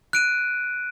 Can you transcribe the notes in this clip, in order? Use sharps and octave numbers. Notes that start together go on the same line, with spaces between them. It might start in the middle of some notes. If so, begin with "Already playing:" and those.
F#6 D7 D#7